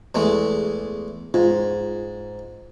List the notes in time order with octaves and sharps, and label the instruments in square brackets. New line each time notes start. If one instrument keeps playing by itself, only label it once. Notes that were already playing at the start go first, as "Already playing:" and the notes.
[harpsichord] E2 G#3 A3
[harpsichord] G#2 [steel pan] F4